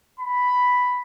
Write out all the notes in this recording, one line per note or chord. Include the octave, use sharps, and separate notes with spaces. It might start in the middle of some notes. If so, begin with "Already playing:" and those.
B5